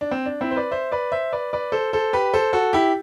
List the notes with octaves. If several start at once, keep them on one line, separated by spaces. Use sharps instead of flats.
D4
C4
D4
C4 E4
C5
B4 D5
C5 E5
B4 D5
C5 E5
B4 D5
B4 D5
A4 C5
A4 C5
G4 B4
A4 C5
F#4 A4
E4 G4